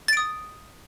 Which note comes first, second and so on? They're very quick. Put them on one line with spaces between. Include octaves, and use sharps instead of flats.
A6 D7 D#6